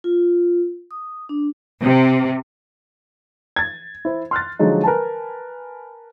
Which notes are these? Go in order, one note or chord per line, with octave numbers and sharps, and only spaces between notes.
F4
D#6
D4
C3
G#6 A6
E4 C5
C6 F6 F#6 A6
D3 F3 F#3 G#3 D#4
A#4 B4 G#5 A5